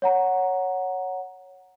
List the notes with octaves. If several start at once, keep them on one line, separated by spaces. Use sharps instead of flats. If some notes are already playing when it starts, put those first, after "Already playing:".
C#5 F#5 A#5